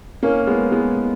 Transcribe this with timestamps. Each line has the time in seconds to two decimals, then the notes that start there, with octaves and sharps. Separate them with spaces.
0.23 A#3 C#4
0.47 G#3 B3
0.72 G#3 B3